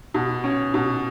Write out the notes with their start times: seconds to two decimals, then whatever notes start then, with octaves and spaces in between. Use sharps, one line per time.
0.14 B2
0.44 C#4
0.74 B2